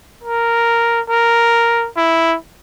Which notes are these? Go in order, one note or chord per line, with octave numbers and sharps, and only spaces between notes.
A#4
A#4
E4